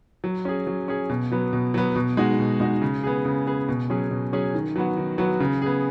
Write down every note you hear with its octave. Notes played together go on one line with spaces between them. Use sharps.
F#3
C#4 G#4
F#3
C#4 G#4
B2
F#3 B3
B2
F#3 B3
B2
G#3 D#4 F#4
B2
G#3 D#4 F#4
C#3
B3 G#4
C#3
B3 G#4
B2
F#3 C#4 G#4
B2
F#3 C#4 G#4
D#3
F#3 B3 F#4
D#3
F#3 B3 F#4
C#3
B3 G#4